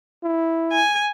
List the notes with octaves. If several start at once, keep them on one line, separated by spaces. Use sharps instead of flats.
E4
G#5